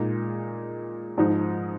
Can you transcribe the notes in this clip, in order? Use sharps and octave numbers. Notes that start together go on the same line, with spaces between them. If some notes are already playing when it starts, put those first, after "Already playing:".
Already playing: A#2 G#3 D#4 G#4
G#2 F3 G#3 D#4